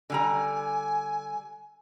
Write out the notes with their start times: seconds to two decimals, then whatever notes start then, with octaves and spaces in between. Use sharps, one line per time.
0.10 D3 G3 G#5 A#5